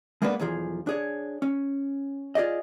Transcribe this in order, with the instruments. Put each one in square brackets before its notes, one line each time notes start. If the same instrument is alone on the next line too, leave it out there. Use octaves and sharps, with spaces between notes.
[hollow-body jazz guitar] G#3 A#3 B3 D4 B4
B1 E2 E3 F3 G#4
D4 G#4 C#5
C#4
F4 G#4 D5 D#5